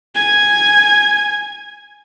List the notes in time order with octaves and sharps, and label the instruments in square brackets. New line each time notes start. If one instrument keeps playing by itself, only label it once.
[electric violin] G#5 G#6